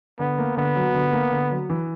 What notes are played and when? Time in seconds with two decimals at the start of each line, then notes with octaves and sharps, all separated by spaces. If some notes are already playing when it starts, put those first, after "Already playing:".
0.19 D3 B3
0.39 A#3
0.57 D3 B3
0.76 F#3
0.95 D3
1.13 A#3
1.32 D3
1.51 F#3
1.70 E3